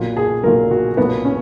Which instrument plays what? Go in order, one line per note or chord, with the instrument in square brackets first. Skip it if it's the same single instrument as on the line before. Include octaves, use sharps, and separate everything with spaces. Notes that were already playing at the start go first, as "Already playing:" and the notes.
Already playing: [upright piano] B1 A#2 F#3
G#4
B1 A#2 F#3 A#4
F#4
B1 A#2 F#3 B3
C#4